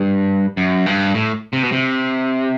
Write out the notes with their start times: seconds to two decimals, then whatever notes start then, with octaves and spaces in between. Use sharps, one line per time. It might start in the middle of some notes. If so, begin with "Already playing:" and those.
Already playing: G2
0.57 F#2
0.86 G2
1.14 A2
1.53 C3
1.63 B2
1.72 C3